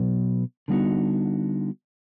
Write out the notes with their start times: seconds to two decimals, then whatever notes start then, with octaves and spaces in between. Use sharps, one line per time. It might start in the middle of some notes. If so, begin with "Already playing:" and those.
Already playing: B2 F#3 B3
0.68 D3 G3 B3 D#4 F#4